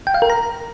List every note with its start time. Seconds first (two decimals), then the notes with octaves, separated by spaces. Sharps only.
0.07 G5
0.14 F5
0.22 A#4
0.30 A#5